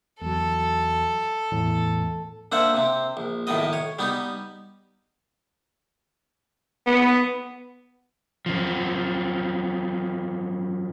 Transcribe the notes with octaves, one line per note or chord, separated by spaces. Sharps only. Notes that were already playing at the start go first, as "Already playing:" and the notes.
E2 F#3 A4
E2 A2
A#3 D4 C5 E5 F#5
C3 C4
A#1
B1 A2 D#3 B3 D#5
C#5
G3 B3 D#4 G4
B3
F#2 F3